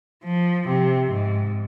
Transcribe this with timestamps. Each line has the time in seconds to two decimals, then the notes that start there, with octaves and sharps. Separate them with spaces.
0.24 F3
0.68 C3
1.10 G#2